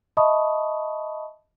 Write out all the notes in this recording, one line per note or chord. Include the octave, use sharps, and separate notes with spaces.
D#5 E5 A5 B5 C#6 D#6